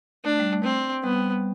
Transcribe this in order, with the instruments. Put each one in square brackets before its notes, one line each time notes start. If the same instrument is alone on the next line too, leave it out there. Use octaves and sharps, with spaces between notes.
[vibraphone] A3 [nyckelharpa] D4
[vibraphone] G3
A3
[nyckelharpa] C4
[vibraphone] G3 [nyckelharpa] B3